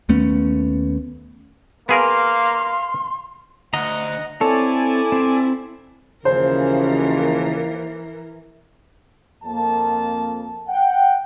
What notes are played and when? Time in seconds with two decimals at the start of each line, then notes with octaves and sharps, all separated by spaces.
0.09 D#2 A3 B3 C#4
1.89 A#3 B3 G#4 A#4 F5 C6
3.74 D2 D#5 F#5 A#5
4.41 C4 E4 A4 C#5 D5 G#5 A5
5.12 C4
6.25 D#2 C#3 E3 F3 A#4 C5
9.44 F2 A#3 A5
10.68 F#5 G5